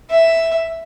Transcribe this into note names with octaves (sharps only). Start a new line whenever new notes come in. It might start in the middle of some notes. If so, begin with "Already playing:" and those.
E5